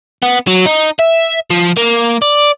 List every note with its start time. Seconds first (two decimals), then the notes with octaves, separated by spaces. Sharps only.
0.23 B3
0.47 F#3
0.66 D#4
0.99 E5
1.50 F3
1.77 A#3
2.22 D5